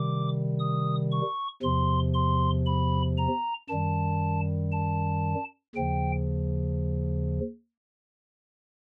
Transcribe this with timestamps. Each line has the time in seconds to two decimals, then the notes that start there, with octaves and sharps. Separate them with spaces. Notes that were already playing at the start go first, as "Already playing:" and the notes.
Already playing: C3 D#3 G3 D6
0.59 D#6
1.11 C#6
1.63 E2 C3 F3 C6
2.14 C6
2.66 B5
3.18 A#5
3.69 F#2 D#3 G3 A5
4.72 A5
5.75 D#2 C#3 F3 G5